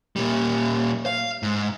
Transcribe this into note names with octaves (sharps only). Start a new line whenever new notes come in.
A#2 G3
F5
G#2